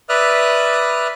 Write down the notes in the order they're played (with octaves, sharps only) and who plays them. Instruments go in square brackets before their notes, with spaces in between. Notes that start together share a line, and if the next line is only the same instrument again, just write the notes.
[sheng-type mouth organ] B4 D5 E5 D#6 F6 F#6